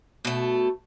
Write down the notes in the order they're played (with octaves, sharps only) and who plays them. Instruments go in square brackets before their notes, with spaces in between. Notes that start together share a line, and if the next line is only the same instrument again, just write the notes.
[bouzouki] B2 A3